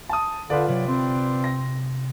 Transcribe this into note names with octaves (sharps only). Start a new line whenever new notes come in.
A5 D#6
D3 F4 B4 D5
C3 F#3
C4
A#6